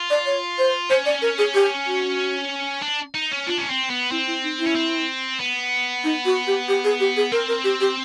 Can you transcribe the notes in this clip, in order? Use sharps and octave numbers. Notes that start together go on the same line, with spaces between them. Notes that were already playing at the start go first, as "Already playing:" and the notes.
Already playing: F4
D5
C#5
C5
C#4 C5
D5
A#4
G#4
G4
F#4
D4
D#4
C#4
D4 F4
C#4
C4
B3
C4 E4
E4
D#4
E4
C#4
C4
B3
D#4
F#4
G4
G4
G#4
G4
G#4
C4 A#4
A#4
G4
G4